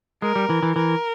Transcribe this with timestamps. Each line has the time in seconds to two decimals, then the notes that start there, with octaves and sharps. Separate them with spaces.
0.22 G#3 A#4
0.36 G3
0.50 E3
0.62 E3
0.76 E3 A#4